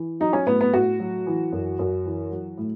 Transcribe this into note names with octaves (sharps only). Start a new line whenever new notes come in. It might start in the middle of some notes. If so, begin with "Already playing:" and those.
Already playing: E3
F#3 D#4
C#4
A2 B3
B3
A2 F#4
F#3
E3
F#2
F#2
E3
F#3
A2